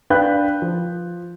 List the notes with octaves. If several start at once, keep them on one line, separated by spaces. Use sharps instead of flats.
D4 B4 F5 G5 F#6 G6
F3